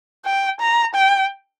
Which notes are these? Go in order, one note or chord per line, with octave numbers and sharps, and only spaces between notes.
G5
A#5
G5